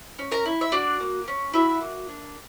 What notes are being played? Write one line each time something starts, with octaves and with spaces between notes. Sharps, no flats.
C#4
A#4 A#5
E4
E5
D4 F#4 D5
A#3
C#4
E4 F#4 E5
A#3
D4